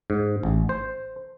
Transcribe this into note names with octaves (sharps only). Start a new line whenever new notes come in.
G#2
A1
C5